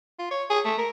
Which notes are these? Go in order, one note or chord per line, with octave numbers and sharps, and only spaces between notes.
F4
C#5
G#4
A3
A#4